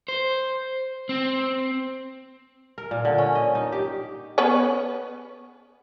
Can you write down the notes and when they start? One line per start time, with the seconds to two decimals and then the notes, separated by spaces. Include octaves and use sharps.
0.08 C5
1.09 C4
2.78 A#4
2.91 A#2
3.05 D3
3.18 C#4
3.35 D#5
3.55 D#4
3.72 G4
4.38 B3 C#4 B4